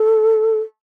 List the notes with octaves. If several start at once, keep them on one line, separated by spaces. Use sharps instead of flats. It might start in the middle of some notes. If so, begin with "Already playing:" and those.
Already playing: A4